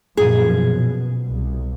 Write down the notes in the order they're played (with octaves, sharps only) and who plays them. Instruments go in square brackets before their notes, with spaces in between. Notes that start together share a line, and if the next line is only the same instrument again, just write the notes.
[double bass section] F#2 A#2 F3 [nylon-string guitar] G#4
[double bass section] B2
C2